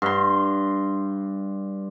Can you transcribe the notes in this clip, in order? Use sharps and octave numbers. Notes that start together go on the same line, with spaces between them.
G2 C6